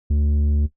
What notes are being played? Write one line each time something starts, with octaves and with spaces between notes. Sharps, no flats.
D2